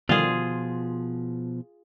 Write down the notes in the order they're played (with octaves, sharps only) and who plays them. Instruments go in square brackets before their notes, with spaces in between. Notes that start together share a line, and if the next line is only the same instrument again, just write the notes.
[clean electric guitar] B2 F3 [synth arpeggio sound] D3 D#3 G3 [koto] F4 G#4